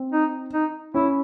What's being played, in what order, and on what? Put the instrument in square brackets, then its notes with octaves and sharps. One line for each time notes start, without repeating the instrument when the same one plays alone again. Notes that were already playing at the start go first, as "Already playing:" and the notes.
Already playing: [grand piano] C4
[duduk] D#4
D#4
[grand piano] C#4 [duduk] E4